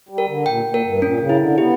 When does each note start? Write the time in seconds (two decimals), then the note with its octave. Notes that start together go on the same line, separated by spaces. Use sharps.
0.09 G3
0.18 A#4
0.28 D3
0.46 A#2 G5
0.65 A#2
0.74 A#4
0.83 G2
1.02 A#2 C#4
1.20 C#3
1.29 E4
1.39 D3
1.58 B3 G4